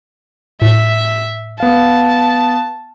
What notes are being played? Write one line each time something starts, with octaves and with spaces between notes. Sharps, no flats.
A2 E5
B3 F5 A5